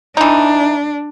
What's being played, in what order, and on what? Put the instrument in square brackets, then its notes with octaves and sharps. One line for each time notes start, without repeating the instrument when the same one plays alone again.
[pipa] E3 D#4 [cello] D4